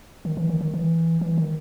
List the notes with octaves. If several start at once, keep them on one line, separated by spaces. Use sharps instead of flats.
D#3
E3
D#3
D#3
E3
E3
D#3